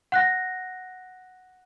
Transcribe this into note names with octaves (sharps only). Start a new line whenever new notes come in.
F#5 F#6 A#6